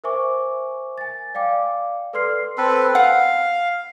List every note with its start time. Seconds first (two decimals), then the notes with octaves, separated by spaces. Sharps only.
0.04 A#4 C5 E5 G#5 C#6 D6
0.98 G#5 A6
1.34 D5 F5 G5 D6
2.13 A4 B4 D5 C6 F6 C7
2.58 C4 A4 B4
2.95 F5 F#5